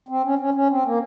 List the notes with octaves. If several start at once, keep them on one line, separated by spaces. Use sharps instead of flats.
C4
C#4
C#4
C#4
C4
A#3